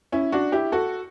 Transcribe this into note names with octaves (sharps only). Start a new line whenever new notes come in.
C#4 E4
D4 F#4
E4 G4
F#4 A4